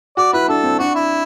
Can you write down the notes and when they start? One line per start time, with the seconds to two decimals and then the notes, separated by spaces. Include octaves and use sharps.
0.17 F#4 D5
0.33 E4 B4
0.48 D4 A4
0.63 C4
0.79 D4 F#4
0.95 E4